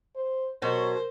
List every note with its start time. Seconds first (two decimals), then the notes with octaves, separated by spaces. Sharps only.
0.15 C5
0.62 B2 F#3 A#4 C5 C#5